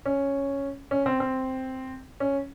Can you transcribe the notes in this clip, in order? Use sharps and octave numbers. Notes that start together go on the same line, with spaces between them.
C#4
C#4
C4
C4
C#4